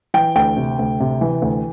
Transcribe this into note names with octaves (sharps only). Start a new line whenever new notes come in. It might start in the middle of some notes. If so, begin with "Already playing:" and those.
E3 G5
D2 G5
C3
D2
C3
E3
D2